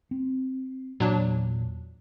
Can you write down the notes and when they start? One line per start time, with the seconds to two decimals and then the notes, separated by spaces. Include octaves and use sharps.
0.11 C4
1.00 E2 A#2 F#3 D4